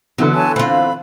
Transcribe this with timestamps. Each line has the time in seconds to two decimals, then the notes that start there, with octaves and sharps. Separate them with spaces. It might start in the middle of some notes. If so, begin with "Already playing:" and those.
0.18 D3 E3 F#3 B3
0.33 C#5 G#5 A5
0.56 C4 F4 F5 B5